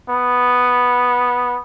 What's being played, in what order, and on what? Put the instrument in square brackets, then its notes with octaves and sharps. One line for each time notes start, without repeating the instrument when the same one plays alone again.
[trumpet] B3